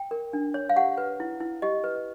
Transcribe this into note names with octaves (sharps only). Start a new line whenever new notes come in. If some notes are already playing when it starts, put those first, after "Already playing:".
Already playing: G5
A#4
D4
C#5
F5
G4 F#5
B4
E4
E4
G4 D#5
B4